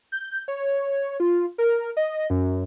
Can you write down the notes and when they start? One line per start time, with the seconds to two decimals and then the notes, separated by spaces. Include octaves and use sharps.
0.12 G6
0.48 C#5
1.20 F4
1.58 A#4
1.97 D#5
2.30 F#2